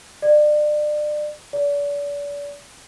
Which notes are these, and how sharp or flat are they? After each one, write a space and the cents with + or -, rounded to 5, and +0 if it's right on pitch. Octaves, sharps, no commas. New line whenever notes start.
D5 +30
D5 -40